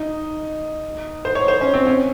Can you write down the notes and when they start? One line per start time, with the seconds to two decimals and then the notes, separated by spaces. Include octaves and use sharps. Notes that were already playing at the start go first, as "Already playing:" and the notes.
Already playing: D#4
1.25 C5
1.35 C#5
1.48 C5
1.61 C#4
1.74 C4
1.87 C#4